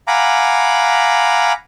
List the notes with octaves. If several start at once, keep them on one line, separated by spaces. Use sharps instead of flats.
F5 F#5 G#5 A#5 B5 D6